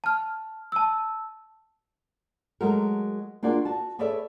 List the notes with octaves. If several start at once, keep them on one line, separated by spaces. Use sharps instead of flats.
A5 F6
A5 E6
F#3 G#3 A3 F#4 A4 A#4
A#3 D4 F4 F#4 G#4 D5
F#4 A5
G#4 A4 B4 C#5 D5 E5